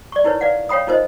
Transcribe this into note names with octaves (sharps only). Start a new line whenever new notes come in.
D5 C#6
D#4 E4 A#4 B4 C#5
B4 D5 F5 F#5
C#5 F5 G5 B5 D#6
D#4 F4 A#4 C5 D#5